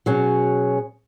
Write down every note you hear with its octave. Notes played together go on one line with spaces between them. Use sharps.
B2 F#3 C#4 G#4